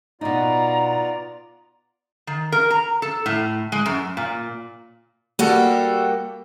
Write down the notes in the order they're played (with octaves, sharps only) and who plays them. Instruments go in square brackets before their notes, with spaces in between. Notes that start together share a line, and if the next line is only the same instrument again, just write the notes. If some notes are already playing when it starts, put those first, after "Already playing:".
[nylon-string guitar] B2 D#4 [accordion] B3 F4 D5 [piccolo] A#5
[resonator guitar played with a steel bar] D#3
A#4
A#5
A4
A2
G#3
F#2
A#2
[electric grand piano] G3 F#4 A4 [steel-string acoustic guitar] A#3 G4